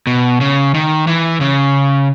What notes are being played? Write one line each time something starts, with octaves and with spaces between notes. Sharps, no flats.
B2
C#3
D#3
E3
C#3